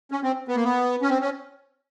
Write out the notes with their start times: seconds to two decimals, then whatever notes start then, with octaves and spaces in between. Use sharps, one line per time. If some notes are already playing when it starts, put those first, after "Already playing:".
0.11 C#4
0.23 C4
0.48 B3
0.56 A#3
0.64 B3
1.02 C#4
1.10 C4
1.21 C#4